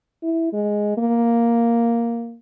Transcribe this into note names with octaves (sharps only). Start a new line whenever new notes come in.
E4
G#3
A#3